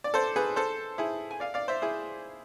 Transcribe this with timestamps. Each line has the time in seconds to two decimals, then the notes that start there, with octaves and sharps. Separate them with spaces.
0.04 D5
0.14 A4 C5
0.36 G#4 B4
0.56 A4 C5
0.98 E4 G#4
1.31 G#5
1.40 D5 F5
1.54 D5 F5
1.68 C5 E5
1.82 E4 G#4